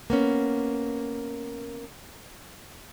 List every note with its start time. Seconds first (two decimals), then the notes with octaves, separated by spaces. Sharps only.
0.10 A#3 B3 C#4